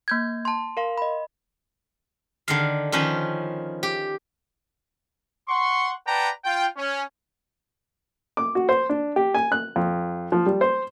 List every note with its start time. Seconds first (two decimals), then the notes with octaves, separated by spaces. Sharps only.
0.08 A#3 G6 G#6
0.45 A5 C6
0.77 A#4 F5 C6
0.98 D#5 B5
2.48 D3 D#3 F5
2.92 D#3 F3 C#4 B4
3.83 G4
5.49 F#5 C6 C#6
6.07 B4 D5 F#5 G5 A5 A#5
6.45 F4 G5
6.77 C#4
8.37 D6
8.55 F#4
8.69 C5
8.90 D4
9.16 G4
9.35 G#5
9.52 F#6
9.76 F2
10.32 F3
10.46 G3
10.61 C5